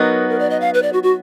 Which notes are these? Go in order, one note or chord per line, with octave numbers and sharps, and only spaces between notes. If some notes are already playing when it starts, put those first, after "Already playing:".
Already playing: F#3 B3 D#4 A#4
A#4
D5
D#5
F5
B4
D5
F#4
F#4